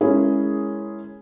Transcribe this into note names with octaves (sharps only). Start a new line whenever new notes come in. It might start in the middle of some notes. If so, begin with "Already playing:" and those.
G#3 C#4 E4 G#4 A#4